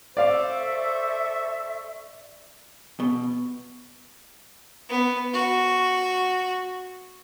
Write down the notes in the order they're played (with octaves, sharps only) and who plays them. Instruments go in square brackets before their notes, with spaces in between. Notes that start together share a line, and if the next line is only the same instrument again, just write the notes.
[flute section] A4 E5 C#6 [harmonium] C5 [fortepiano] D5 F5
[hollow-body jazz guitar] B2
[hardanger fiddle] B3
F#4